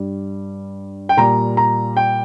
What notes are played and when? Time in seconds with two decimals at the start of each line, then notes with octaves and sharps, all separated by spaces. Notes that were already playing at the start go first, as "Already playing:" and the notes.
Already playing: G2 G3
1.09 G5
1.17 A#2 G3 A#5
1.57 A#5
1.97 G5